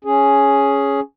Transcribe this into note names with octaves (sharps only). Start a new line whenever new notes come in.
C#4 G#4